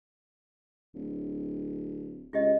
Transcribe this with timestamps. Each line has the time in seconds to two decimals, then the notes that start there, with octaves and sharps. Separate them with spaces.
0.95 D1
2.33 C#2 F4 G4 D#5